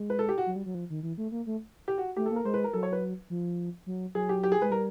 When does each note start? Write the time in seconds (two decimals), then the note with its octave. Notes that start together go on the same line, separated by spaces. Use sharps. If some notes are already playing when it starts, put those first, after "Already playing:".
Already playing: G#3
0.10 B4
0.19 A4
0.29 G4
0.38 F#4
0.46 F#3
0.56 G3
0.66 F#3
0.75 F3
0.90 D#3
1.03 E3
1.18 A3
1.32 A#3
1.46 A3
1.88 G4
1.98 F#4
2.17 A3 G4
2.26 A#3 A4
2.36 A#4
2.45 G#3 C5
2.54 B4
2.64 A#4
2.73 F#3 A4
2.83 C#5
2.92 B4
3.30 F3
3.86 F#3
4.15 F#3 G#4
4.29 G4
4.44 G4
4.52 G#4
4.62 G#3 B4
4.71 G3 A#4